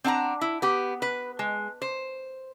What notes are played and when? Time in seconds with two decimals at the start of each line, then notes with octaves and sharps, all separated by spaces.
0.04 C4 D4 F#5 A5 A#5
0.41 E4
0.62 B3 G4
1.02 B4
1.39 G#3
1.82 C5